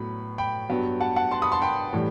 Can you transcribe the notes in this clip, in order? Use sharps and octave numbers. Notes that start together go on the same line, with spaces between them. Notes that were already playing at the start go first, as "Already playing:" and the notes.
Already playing: A2 F#3 B3 B5
G5 B5
G2 F#3 B3
F#5 A5
F#5 A5
A5 C6
B5 D#6
A5 C6
G5 B5
A2 E3 G3